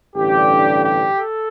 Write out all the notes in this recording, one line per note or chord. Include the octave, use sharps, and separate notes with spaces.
A1 G2 D3 G4
G4
A4